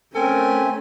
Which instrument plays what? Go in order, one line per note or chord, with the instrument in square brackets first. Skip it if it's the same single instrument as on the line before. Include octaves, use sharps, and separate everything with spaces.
[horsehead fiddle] A3 C#4 [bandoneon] C4 G#5 [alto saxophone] A#4